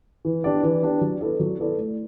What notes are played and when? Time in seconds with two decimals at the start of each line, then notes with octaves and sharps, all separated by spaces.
0.25 E3
0.44 B3 D4 G4 D5
0.63 E3
0.83 B3 D4 G4 D5
1.01 F#3
1.21 B3 E4 A4 D5
1.40 F#3
1.59 B3 E4 A4 D5
1.78 A3